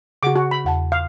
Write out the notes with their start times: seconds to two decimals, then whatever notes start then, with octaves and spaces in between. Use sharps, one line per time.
0.23 C#3 F#4 G#4 F#5 D6
0.36 F#4
0.51 B5
0.64 E2 F#5 A5
0.92 F5